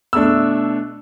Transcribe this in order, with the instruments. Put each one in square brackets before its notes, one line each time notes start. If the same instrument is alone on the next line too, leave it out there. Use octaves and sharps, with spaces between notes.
[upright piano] B2 A3 D4 E6